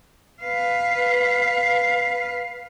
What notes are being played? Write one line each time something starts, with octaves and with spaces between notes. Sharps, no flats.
B4 F5